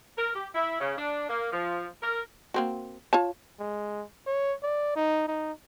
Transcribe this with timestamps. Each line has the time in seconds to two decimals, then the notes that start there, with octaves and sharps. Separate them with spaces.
0.18 A#4
0.35 G4
0.55 E4
0.81 C#3
0.98 D4
1.29 A#3
1.52 F3
2.02 A#4
2.54 A#3 C4 F#4
3.13 F4 C#5 A5
3.60 G#3
4.26 C#5
4.63 D5
4.96 D#4
5.28 D#4